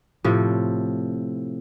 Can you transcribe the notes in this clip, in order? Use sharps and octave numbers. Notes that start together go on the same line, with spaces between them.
A2 C3 F3